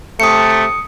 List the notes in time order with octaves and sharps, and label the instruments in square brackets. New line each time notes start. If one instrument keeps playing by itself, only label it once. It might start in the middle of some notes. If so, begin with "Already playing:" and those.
[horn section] C3 A3 [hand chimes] D#6 C#7